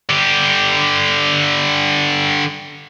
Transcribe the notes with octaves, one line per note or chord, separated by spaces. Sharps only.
D3 G4